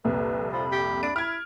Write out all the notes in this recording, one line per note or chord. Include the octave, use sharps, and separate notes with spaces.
C2 F2 A#2 B4
F3 B5
G4
D4 D7
E4 F6 G#6